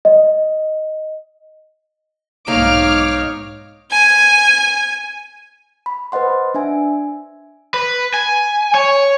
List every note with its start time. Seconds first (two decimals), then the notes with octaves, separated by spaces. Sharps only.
0.05 D#5
2.48 B1 G#2 A#3 D#4 C#5 F5 D6 F6
3.91 G#5 G#6
5.86 B5
6.12 B4 C5 D#5 F#5 C6
6.54 D4 E5 G#5
7.74 B4
8.14 G#5
8.75 C#5